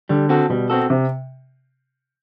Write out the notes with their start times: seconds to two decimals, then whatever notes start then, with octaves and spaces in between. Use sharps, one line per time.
0.09 D3 G3
0.29 C4 F#4 A4
0.50 B2 G3
0.70 C4 F#4 A4
0.90 C3